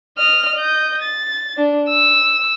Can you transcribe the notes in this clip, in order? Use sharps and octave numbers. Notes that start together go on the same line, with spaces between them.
D#5 F6
D#5 G6
A6
D4
E6